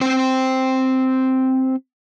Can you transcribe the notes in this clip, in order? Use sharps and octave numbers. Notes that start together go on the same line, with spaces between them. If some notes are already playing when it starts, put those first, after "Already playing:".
C4 C5